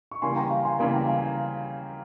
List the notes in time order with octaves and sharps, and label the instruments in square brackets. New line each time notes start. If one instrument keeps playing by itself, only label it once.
[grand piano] C#6
[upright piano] C#3 E3 G3 A#3 [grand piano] G#5 C6
[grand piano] G5 A#5
F5 G#5
G#5 C6
[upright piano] C#3 E3 G3 A#3 [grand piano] F5 G#5
[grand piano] G5 A#5
F5 G#5